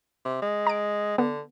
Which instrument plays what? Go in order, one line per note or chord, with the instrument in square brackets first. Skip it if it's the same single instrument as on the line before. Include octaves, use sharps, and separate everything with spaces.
[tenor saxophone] C3
G#3
[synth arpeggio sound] A#5 D7
[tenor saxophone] D3 [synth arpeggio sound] B3